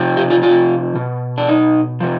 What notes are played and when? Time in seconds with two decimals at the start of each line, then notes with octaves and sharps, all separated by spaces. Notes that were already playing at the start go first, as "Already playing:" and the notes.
Already playing: C3 F3
0.17 G4
0.30 F4
0.43 F4
0.95 B2
1.38 D4
1.49 D#4
2.00 C3 F3